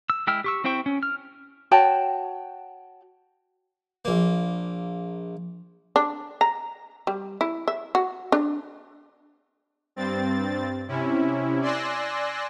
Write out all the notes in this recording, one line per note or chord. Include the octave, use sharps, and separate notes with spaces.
E6
G#3 E4 G5 E6 F6
G4 C#6 E6
C4 E4 C5 G5 C#6
C#4
F6
F#4 C#5 G5 A5
A#1 A#3
D4
A#5
G3
E4
E5
F#4
D4
G2 C4 A6
C3 C#4 E4
D5 G#5 C6 E6 F#6 A#6